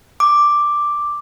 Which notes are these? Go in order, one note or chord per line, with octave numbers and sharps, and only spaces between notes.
D6